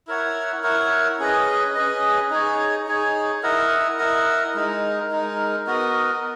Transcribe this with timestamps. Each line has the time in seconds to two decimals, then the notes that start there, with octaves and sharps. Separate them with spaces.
0.07 E4 A#4 C#5 F#5
0.63 E4 A#4 C#5 F#5
1.19 C#4 G#4 B4 D#5
1.75 C#4 G#4 B4 D#5
2.30 D#4 G#4 C#5
2.87 D#4 G#4 C#5
3.43 E4 A#4 D#5 F#5
3.99 E4 A#4 D#5 F#5
4.54 G#3 D#4 A#4
5.11 G#3 D#4 A#4
5.67 B3 F#4 A#4 D#5